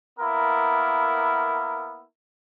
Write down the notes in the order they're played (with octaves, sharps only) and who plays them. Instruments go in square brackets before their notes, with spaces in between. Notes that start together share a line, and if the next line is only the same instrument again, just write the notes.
[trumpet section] A#3 B3 E4 A#4